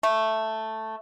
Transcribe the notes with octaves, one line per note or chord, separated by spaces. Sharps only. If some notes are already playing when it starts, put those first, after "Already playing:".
A3